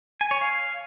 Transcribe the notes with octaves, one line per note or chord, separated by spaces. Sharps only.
G#5
C#5
F5